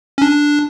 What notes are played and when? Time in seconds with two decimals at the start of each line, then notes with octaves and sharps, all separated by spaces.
0.18 C#4
0.22 D4